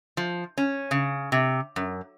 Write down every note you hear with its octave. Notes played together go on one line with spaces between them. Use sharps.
F3
C#4
C#3
C3
F#2